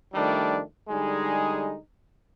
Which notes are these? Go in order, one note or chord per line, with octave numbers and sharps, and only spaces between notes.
D#3 F3 G3 A3 D4
D3 G3 G#3 D#4 G#4